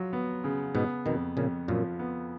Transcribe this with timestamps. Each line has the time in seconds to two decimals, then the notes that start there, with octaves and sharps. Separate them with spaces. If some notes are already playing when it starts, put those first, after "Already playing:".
Already playing: F#3 F4
0.13 B3
0.44 C#3
0.75 G#2 B2 B3
1.06 F2 B2 D#3
1.37 F2 A#2 C#3
1.68 F#2 A#2 F3
1.99 B3